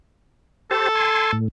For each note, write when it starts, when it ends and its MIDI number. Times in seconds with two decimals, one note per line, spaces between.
0.71 0.88 67
0.71 1.33 69
0.71 0.88 72
0.71 0.88 81
0.95 1.31 80
0.95 1.31 84
1.33 1.48 45